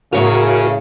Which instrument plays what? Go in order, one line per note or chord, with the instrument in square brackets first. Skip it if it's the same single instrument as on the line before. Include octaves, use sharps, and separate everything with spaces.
[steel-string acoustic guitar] A2 C#5 F5 [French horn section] C#3 [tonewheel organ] F#4 A#4